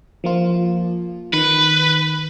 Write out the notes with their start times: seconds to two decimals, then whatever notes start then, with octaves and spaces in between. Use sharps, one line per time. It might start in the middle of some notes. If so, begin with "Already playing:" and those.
0.24 F3 A#3 F4
1.33 D#3 B4